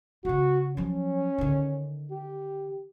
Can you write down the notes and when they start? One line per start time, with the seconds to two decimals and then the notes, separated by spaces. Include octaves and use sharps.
0.25 C#3 F4 F#4
0.77 F3 F#3 C#4
1.38 D3 D#3
2.11 G4